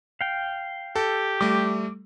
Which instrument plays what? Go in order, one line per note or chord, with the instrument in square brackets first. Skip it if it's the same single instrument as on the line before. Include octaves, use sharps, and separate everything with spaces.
[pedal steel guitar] F5 G5
[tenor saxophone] G4 [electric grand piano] A4
[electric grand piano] G3 A3 [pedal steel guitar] D6